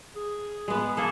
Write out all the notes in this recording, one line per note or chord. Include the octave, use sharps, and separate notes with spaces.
G#4
G#3 B3
A#3 G#4 A4 A5